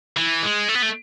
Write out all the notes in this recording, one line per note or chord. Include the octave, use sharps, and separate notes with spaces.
E3
G#3
A3
B3
A3